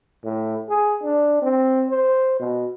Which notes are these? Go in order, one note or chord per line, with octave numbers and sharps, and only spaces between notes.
A2
G#4
D4
C4
C5
B2